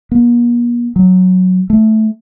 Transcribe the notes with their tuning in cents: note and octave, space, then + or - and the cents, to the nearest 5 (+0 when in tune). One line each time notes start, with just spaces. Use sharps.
A#3 +45
F#3 -5
A3 -10